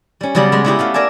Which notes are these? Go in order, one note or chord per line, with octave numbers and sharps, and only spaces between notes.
G3 C#4
C#3 F#3 G3 B3 D5
G#3 G#4 B5
B3 C#4 E4 F#4 G4 B4
A3 C#4 F5
A#4 D5 E5 G#5 A5